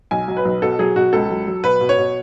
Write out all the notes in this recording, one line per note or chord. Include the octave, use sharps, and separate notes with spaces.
B1 G#5
F#3
B4
B1
B2 A4
F#3 G#4
B2 F#4
C#2 A4
F#3
F#3
B2 B4
B2
C#5
B2